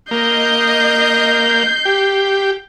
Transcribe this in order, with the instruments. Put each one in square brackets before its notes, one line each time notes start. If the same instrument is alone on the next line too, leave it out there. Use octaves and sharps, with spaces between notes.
[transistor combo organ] A#3 [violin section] D#5 [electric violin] G6 C7
[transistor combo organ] G4